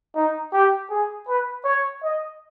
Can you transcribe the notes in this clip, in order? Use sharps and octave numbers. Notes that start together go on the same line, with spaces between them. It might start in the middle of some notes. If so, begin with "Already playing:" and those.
D#4
G4
G#4
B4
C#5
D#5